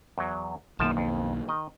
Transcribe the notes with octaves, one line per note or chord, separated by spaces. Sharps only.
E2 F#3
B1 F#2 D#3 F3 A#3 A5
F2
D#3 D#5